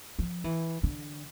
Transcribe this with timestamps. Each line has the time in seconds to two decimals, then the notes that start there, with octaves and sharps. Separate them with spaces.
0.19 F3
0.44 E3
0.83 D3